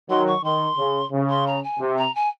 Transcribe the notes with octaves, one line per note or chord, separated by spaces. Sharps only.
D#3 F#3 C6
C#6
D#3 C6
C#3
C#3
C6
A#5
G#5
C3
A#5
G#5